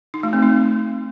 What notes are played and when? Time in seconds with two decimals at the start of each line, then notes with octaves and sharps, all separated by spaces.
0.14 D#4
0.23 A3
0.33 C4
0.42 D#4